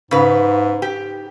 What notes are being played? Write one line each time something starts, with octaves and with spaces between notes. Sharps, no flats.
G#2 C#3 B4
G4